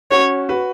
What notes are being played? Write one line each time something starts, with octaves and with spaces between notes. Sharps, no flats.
C#4 F#4 C#5
F#4 B4